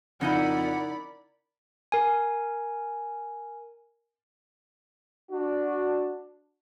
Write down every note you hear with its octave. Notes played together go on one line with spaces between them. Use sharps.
F2 C#3 D#4 E4 A#4 D5 F#5 B5
A#4 G#5
D4 F#4